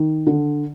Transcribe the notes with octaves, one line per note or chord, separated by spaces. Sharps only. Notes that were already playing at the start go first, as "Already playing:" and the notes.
Already playing: D#3
D3